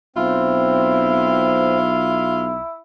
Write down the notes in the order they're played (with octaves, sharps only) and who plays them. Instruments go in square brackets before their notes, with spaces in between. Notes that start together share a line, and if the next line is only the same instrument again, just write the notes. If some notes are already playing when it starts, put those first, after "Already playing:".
[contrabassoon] B1 [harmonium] C4 [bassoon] E4 [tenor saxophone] F4